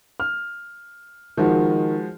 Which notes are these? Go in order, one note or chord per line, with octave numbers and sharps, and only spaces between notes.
F6
D#3 F3 G#3 F#4